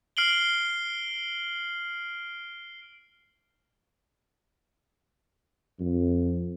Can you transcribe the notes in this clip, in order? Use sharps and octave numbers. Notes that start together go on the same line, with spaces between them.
F6 C7 D7 F#7 G7
F2